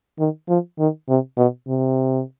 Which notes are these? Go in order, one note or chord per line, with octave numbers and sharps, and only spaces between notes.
D#3
F3
D#3
C3
B2
C3